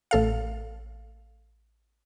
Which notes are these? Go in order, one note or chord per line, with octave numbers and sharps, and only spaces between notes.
A1 A4 F5